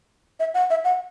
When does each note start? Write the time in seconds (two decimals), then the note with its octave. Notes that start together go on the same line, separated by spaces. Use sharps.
0.40 E5
0.54 F#5
0.70 E5
0.84 F#5